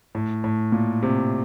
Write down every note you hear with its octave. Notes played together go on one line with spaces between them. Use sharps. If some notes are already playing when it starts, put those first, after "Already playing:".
A2
A2
A#2
C3